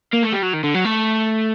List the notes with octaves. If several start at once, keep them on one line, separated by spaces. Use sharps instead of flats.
A#3
A3
G3
F#3
D#3
D3
F#3
A3